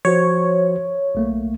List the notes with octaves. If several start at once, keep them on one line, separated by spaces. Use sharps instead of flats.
F3 F#4 C5 C#5
B1 A3 A#3